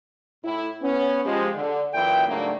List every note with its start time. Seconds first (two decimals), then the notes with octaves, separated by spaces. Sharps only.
0.44 A2 E4
0.82 B3 C#4
1.25 F3 G#3 G4 G#4
1.55 D3
1.94 F#2 A#2 E3 E4 E5 G5
2.27 G#2 C#3 F#3 A3 A#3 D4